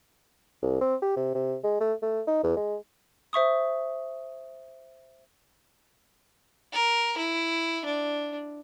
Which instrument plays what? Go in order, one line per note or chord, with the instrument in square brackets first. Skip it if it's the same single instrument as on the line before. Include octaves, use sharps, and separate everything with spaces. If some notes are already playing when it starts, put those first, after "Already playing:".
[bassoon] C2
C4
G4
C3
C3
G#3
A3
A3
D#4
E2
G#3
[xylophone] C5 E5 C#6 D#6
[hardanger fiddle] A#4
E4
D4